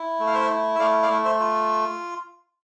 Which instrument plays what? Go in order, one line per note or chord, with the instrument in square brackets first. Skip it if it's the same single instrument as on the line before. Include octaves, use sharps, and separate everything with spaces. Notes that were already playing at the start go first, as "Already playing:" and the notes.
Already playing: [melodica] E4
A3
F5
C5 E5
E4
E5
A3 D5 F5
D5 F5
A3
C5 E5
F4